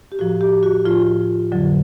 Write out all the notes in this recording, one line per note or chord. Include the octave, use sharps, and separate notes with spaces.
G4
A2 F3 F#4
G4
F#4
A2 F3 F4
F2 D3 F#3